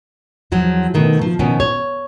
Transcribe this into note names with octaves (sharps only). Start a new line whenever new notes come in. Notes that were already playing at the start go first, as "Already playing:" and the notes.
E2 F3 F#3
B2 D#3 A3
F3
B2 D#3 F3 C#4
C#5